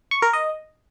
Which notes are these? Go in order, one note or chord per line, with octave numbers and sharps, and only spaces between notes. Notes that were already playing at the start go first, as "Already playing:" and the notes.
C#6
A#4
D#5